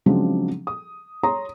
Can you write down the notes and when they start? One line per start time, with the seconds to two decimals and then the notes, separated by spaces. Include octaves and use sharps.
0.06 C#3 F3 F#3 G#3 C4 D4
0.67 D#6
1.23 C#5 A#5 C6 D#6